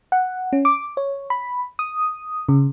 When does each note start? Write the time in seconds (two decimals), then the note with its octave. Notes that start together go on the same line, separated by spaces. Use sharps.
0.12 F#5
0.53 C#4
0.65 D6
0.97 C#5
1.30 B5
1.79 D#6
2.49 C#3